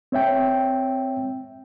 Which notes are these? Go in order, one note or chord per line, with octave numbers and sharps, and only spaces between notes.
C4 C#5 E5 G5